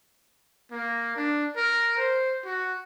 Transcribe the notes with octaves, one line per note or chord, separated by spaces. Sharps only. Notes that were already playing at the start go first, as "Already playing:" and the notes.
A#3
D4
A#4
C5
F#4